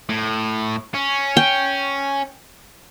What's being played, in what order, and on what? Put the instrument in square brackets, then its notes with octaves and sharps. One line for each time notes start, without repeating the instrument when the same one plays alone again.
[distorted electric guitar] A2
C#4
[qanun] G5